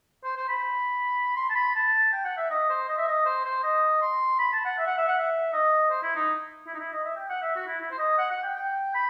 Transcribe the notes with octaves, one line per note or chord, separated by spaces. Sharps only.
C5
C5
B5
C6
A5
B5
A5
G5
F#5
E5
D#5
C5
D#5
E5
D#5
C5
C5
D#5
C6
B5
A5
F#5
E5
F#5
E5
F#5
E5
D#5
C5
E4
D#4
E4
D#4
E4
D#5
E5
G5
F#5
E5
F#4
E4
E4
C5
D#5
F#5
F#5
G5
G5
B5